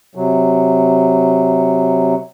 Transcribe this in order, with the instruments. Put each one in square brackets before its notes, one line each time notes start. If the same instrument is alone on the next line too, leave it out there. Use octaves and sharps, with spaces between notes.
[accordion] C3 F#3